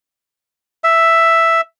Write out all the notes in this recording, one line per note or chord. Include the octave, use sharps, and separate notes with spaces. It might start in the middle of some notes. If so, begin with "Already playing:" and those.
E5